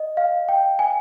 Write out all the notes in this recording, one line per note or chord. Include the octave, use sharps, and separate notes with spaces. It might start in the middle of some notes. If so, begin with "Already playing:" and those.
Already playing: D#5
F5
G5
G#5